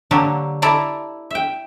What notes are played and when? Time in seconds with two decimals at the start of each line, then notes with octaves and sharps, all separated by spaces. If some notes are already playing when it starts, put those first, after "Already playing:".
0.11 D3 F#3 A#3 G4 A4
0.62 E4 A4 D5 A5 A#5
1.31 E5 G5